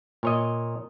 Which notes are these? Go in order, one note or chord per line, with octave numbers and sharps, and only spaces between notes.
A#2 C#5 D#5